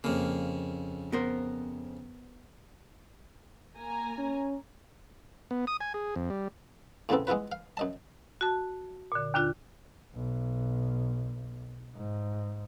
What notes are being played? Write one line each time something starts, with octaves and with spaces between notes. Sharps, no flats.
F2 C#3 A#3
B3 A#4 C5
A#3 G#5 A#5
C#4
B3
D#6
G#5
G#4
F2
G3
E2 A2 C#3 B3 C4 A4
G#3 B3 E4 F4 B4
F5
F#2 D#5 A5
F#4 A5
A#2 D3
D#2 D3 D4 F4 F#6
B1
G#2